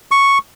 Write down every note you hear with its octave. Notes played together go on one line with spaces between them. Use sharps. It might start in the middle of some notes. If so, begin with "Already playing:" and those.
C#6